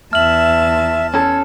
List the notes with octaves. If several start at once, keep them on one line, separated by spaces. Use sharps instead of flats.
E2 E5 A5 F6 F#7
C#4 A4 G#6